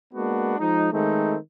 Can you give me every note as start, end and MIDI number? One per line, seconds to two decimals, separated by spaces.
0.14 0.56 56
0.14 0.56 58
0.14 0.56 59
0.14 0.56 62
0.14 0.56 66
0.58 0.88 53
0.58 0.88 56
0.58 0.88 63
0.92 1.36 51
0.92 1.36 56
0.92 1.36 57
0.92 1.36 60
0.92 1.36 63